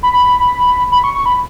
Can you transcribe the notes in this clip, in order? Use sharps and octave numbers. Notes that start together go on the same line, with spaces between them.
B5
B5
C#6
C#6
B5